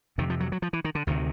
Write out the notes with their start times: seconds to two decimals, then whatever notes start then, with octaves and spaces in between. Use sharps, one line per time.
0.18 F2 C3 D#3
0.30 F3
0.40 F#3
0.52 F#3
0.62 F3
0.73 E3
0.84 D#3
0.95 D3
1.07 D2 C3 D#3